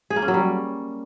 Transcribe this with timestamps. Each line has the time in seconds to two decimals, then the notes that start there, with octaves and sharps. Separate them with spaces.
0.10 G#4
0.16 A#3
0.22 C#4
0.28 F#3
0.34 G3